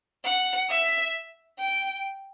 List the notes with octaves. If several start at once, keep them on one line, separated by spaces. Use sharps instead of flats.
F#5
E5
G5